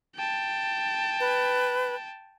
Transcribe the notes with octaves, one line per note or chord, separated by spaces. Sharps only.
G5 A5
B4